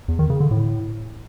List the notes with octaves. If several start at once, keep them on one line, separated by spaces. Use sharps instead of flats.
E2
D#3
C#3
D3
A2